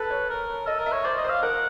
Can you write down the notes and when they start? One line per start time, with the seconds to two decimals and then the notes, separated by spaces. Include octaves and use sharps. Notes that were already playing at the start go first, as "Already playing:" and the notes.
Already playing: A4 B4
0.10 C#5
0.30 A#4
0.67 A4 D#5
0.80 A#4
0.86 E5
0.93 C#5
1.04 C5 D5
1.17 D#5
1.24 C5
1.30 F5
1.43 A#4 F#5